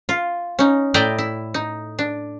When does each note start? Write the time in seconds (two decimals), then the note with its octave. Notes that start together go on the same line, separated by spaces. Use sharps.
0.09 F4
0.59 C#4 D#4
0.94 A2 E4 D5 D#5 G5 A#5
1.18 E4
1.54 D#4
1.99 D4